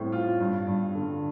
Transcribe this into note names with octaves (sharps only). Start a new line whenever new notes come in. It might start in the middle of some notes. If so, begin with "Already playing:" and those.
Already playing: A2 G3 C4
F4
G2
G2
D3